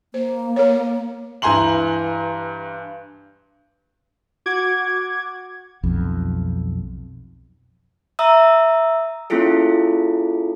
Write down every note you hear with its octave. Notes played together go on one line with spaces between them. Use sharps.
A#3 C5
A#4 C#5
G2 E3 G#5 A#5 C6 F#7
F#4 F#5 D6 G#6
B1 F2
E5 A#5 D#6 E6
A#3 C#4 E4 F4 G#4 A4